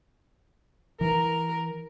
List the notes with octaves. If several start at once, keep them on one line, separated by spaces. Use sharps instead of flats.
E3 A#4